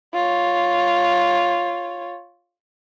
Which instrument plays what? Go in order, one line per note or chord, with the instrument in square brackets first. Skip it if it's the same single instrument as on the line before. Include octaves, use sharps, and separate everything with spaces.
[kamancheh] F4 C#5